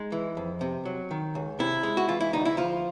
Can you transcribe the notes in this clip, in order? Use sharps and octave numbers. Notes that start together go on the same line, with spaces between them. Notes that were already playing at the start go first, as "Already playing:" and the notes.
Already playing: G#3 D#4
E3
F2
C3
F#3
D#3
C#2
C3 E4
G#3
F#4
E3 F4
E4
D2 D#4
E4
F3 F4